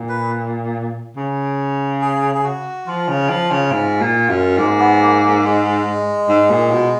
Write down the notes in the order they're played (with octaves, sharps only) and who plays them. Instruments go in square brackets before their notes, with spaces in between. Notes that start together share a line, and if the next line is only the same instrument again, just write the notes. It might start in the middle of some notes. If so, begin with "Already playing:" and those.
Already playing: [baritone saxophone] A#2
[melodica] B4
[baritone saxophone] C#3
[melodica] G#4
G#4
F#4
[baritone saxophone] F3 [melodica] F4
[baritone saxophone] C#3
F3
C#3
G#2
A#2
F#2
[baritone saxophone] G#2 [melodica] A#3
[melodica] B3
A#3
A#3
G#3
[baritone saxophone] G#2
A#2
B2